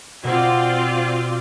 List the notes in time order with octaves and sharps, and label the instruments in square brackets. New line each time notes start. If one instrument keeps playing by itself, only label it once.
[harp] B2 [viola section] C4 F4 D5